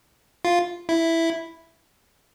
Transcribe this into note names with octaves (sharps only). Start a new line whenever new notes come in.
F4
E4